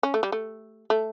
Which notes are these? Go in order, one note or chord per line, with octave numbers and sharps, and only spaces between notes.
C#4
A3
G3
A3
A3